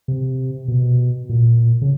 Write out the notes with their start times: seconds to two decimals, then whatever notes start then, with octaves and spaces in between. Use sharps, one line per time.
0.08 C3
0.68 B2
1.29 A#2
1.82 C#3